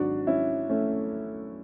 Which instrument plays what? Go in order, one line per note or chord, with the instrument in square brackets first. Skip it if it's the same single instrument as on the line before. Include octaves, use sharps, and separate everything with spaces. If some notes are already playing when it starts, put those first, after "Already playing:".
Already playing: [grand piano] G#1 G#2 F#3 D4 F#4
C#4 E4
A3 C#4